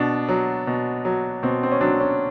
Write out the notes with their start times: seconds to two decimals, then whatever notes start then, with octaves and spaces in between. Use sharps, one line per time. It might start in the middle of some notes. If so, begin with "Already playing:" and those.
Already playing: B2 D4
0.29 F#3
0.67 B2
1.05 F#3
1.43 B2 C4
1.63 C4
1.72 C#4
1.81 F#3 D4
2.00 C#4